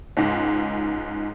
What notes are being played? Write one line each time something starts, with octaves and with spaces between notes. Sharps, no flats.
C#2 G#2